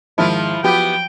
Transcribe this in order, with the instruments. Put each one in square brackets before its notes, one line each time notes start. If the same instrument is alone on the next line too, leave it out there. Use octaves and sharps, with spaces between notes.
[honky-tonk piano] G#2 D#3 [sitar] F3 E4 F4
[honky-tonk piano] F3 F#3 [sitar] B3 G4 [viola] G5